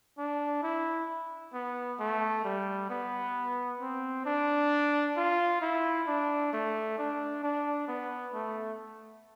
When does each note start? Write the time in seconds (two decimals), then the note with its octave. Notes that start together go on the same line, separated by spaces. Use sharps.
0.18 D4
0.63 E4
1.53 B3
2.00 A3
2.44 G3
2.90 B3
3.81 C4
4.26 D4
5.17 F4
5.61 E4
6.07 D4
6.53 A3
6.98 D4
7.44 D4
7.88 B3
8.34 A3